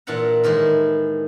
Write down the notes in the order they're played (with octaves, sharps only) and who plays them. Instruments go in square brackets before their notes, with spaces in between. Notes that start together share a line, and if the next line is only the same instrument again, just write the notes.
[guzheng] A#2 E3 D4 F#5 A#5
A2 D#3 E3 G#3